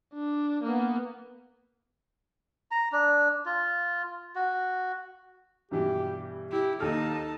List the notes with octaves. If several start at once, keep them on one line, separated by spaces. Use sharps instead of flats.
D4
A#3 B3
A#5
D4
F4
F#4
G2 B2 E3 G4
E4 G4
D#2 D#4 A4 A5 F6